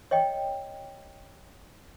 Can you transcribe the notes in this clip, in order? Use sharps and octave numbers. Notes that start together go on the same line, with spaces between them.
C#5 D#5 G5